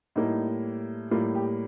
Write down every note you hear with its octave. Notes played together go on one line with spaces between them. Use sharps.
A2 G3 A#3 D#4
A2 G3 A#3 F4
G4